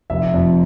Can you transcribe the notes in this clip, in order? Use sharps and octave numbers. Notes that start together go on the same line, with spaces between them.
F1 E5
F2